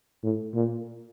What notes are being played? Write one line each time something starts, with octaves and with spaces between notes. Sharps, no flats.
A2
A#2